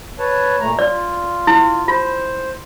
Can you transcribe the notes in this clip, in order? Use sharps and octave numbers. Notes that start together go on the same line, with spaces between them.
B4 C#5 A5
A#2 A3 A#5
F4 D5
E4
F4 C5